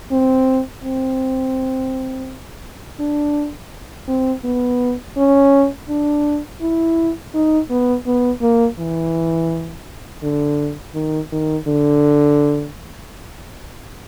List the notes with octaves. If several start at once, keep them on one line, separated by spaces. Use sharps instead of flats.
C4
C4
D4
C4
B3
C#4
D4
E4
D#4
B3
B3
A#3
E3
D3
D#3
D#3
D3